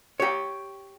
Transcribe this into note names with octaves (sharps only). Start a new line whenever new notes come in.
G4 C#5